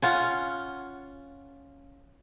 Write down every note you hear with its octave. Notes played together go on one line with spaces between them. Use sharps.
C#4 F4 F#5